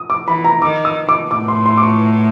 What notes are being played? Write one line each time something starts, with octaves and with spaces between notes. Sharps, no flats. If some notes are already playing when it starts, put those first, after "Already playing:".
Already playing: D#6
D6
E3 B5
A#5
D#3 D6
D#6
D6
A2 D6
C6
C6
D6
C#6